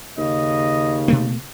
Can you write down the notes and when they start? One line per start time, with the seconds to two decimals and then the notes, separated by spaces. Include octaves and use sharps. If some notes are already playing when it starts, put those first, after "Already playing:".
0.18 D#2 C#3 D#5
1.08 B2 A3 A#3